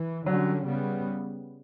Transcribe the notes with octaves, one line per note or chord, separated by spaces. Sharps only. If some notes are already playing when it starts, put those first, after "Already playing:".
Already playing: E3
D3 F#3 G3 C#4
C#3 G3 B3